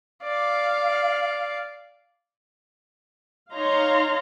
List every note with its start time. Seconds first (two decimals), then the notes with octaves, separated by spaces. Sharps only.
0.24 D5 F5
3.53 D#4 C#5 F5 A#5 C6